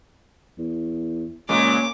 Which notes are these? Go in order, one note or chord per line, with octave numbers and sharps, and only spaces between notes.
E2
C#2 A#2 G#3 A#3 C#4 D6